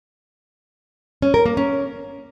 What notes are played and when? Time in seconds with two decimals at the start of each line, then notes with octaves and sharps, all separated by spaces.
1.22 C#4
1.34 A#4
1.46 A#3
1.57 C#4